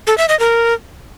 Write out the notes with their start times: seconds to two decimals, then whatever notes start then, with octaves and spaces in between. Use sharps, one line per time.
0.07 A4
0.18 E5
0.29 D#5
0.39 A#4